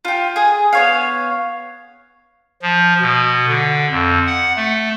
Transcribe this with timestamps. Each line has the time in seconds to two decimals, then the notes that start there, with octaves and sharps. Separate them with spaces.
0.05 F4 G4
0.36 G#4
0.73 B3 C#5 F5
2.62 F3
3.01 B2
3.48 D3
3.91 F2
4.27 F#5
4.57 A3